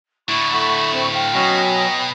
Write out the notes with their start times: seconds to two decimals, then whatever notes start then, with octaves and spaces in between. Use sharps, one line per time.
0.29 A2 D3 E4 C#6
0.53 A3 F#5 B5 E6
0.91 C4
1.13 F5 G5
1.34 B2 F#3 C#4 F#4 D#5 G#5
1.74 D#5 A#5